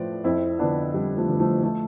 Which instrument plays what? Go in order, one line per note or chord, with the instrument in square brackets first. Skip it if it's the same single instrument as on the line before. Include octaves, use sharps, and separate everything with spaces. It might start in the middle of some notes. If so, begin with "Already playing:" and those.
Already playing: [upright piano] A2 F3 B4 C5 D5
F2 C4 E4
D3 F3 B3 D4
F2 G3
F3 A3
D3 F3
F3 A3
F3 A3